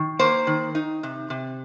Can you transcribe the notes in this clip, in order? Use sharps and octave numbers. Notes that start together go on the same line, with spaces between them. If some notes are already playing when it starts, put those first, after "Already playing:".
Already playing: D#3
A#3 C5
D#3
D#4
C3
C3